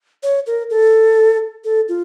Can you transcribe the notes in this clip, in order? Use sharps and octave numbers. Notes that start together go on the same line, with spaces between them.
C#5
A#4
A4
A4
F4